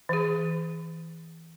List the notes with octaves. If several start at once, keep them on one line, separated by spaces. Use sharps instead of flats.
E3 G#4